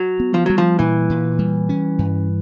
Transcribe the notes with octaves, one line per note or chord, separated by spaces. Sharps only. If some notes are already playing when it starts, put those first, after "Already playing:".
Already playing: F#3
B3
F3
F#3 G3
F3
A#2 E3
A#2
G3
C#4
G2